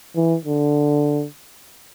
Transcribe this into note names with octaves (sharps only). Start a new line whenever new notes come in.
E3
D3